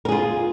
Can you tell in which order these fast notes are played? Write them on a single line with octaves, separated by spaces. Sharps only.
A#4 G#4 F4